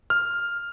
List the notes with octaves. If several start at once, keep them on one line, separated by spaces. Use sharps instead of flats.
F6